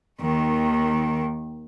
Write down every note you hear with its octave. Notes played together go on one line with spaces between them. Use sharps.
D#2 D#3